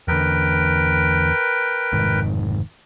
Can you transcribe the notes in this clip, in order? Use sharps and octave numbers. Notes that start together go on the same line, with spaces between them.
E2 D3 A#4 B4 G5
F1 G#2 D#3